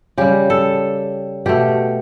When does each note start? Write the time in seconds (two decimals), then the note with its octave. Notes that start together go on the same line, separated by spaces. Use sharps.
0.17 C#3 G3 G4
0.50 A4
1.46 B2 A3 G4